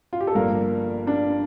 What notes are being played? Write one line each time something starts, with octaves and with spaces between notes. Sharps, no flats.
F4
G4
A4
G1 G2 F3 A#3 A#4
D4 D5